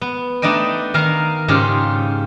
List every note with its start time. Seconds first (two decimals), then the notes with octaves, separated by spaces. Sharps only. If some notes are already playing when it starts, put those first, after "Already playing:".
0.01 B3
0.42 A3 D4 D#4 D#5 G5
0.94 D#3 A#4 F5 A#5
1.48 G#2 C#3 F4 G4